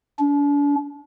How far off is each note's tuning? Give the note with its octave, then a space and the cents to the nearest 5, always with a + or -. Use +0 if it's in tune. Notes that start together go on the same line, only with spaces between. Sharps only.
D4 -40